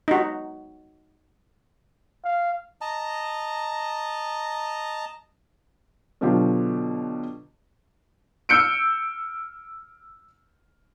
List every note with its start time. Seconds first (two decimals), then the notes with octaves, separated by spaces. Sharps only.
0.08 D#4 F#4
2.24 F5
2.81 D#5 A5 A#5
6.21 B2 D3 F#3 F4 G4
8.49 E6 F6 G6 C#7 D7